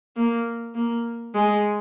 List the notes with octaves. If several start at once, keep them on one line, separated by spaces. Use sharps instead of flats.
A#3
A#3
G#3